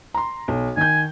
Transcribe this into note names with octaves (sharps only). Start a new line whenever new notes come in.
A#5 C6
B1
D#3 G#5 G6